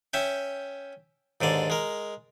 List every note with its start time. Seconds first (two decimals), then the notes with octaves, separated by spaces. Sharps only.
0.13 C#4 E5 G5
1.41 D#2 G#2 D3 D5
1.70 G#3 A#4